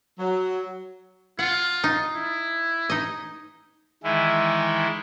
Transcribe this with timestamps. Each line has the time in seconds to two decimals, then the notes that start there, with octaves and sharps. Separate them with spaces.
0.19 F#3
1.39 F4 F#5
1.84 D#4
2.15 E4
2.90 D#4 D#5
4.03 D#3 E3 G#3 E4